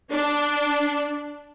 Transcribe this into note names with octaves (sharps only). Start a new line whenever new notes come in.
D4